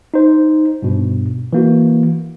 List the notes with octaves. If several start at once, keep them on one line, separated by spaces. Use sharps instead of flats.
D#4 C5
G2 B2
E3 A#3 F#4